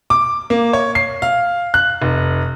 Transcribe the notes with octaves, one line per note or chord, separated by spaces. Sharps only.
D6
A#3
C#5
C7
F5
F#6
F1